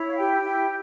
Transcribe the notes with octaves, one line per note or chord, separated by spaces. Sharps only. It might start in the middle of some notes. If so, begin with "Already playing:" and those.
Already playing: E4 C#5
F5
G4 G5
E4